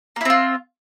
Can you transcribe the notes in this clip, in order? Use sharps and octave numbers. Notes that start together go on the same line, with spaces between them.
A#3 C4 E4 F4